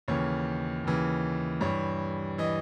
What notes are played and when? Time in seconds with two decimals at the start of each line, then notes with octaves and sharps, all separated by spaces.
0.08 D#2 C#3 E3 C#5
0.84 D#2 C#3 E3
1.61 G2 E3 C#5
2.38 E3 D#5